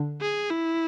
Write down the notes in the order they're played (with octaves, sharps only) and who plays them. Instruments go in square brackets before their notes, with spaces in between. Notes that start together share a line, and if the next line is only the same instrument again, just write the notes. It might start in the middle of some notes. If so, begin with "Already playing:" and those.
Already playing: [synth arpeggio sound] D3 D4
[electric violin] G#4
E4